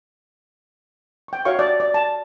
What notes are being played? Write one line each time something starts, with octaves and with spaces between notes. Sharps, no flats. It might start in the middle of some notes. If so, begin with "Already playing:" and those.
G5 C#6
F#4 C#5 E5 F5 C#6
D5
D5
A5